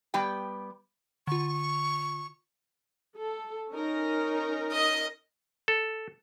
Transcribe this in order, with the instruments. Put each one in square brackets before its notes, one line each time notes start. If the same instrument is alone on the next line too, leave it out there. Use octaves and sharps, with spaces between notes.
[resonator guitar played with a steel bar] G3 B3 G4 G5
[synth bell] D3 F4 [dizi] C#6
[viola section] A4
C#4 D#4 A#4
[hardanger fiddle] D#5 D#6
[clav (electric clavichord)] A4